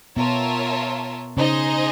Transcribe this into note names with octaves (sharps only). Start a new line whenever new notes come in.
B2 B3 F4 A#4 C#5 E5 A5
C#3 C#4 D#4 G#4 C5 D#5